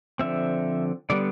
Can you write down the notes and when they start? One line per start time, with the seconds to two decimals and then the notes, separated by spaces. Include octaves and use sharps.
0.19 D3 F3 C4 E5
1.10 D3 G3 B3 D5